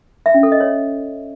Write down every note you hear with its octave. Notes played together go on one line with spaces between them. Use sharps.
E5
C#4
A4
D#5
C#5